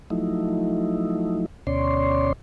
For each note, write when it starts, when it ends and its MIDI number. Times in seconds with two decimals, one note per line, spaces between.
0.10 1.46 53
0.10 1.46 54
0.10 1.46 57
0.10 1.46 63
0.10 1.46 64
1.67 2.33 38
1.67 2.33 47
1.67 2.33 61
1.67 2.33 73
1.67 2.33 74
1.67 2.33 84